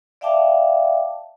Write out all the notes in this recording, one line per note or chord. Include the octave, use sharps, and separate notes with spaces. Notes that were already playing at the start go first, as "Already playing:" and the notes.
D5 E5 F5 G5 A5 D6